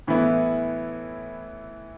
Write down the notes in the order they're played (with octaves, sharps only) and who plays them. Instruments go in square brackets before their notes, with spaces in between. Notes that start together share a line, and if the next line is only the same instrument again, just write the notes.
[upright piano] A2 E3 B3 E4